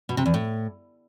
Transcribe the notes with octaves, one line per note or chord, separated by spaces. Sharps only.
B2
C3
E2
A2